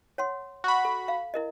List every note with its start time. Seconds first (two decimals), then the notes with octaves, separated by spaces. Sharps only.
0.18 C#5 F#5 C6
0.64 F#4 B5
0.85 A4
1.08 F5
1.34 E4 A#4 D#5